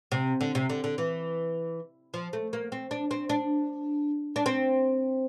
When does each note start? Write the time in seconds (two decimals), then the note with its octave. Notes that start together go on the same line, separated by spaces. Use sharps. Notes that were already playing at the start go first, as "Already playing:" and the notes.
0.12 C3
0.41 D3
0.55 C3
0.70 D3
0.84 D3
0.98 E3
2.14 F3
2.33 A3
2.53 A#3
2.72 C4
2.91 D4
3.11 C4
3.29 D4
4.36 D4
4.46 C4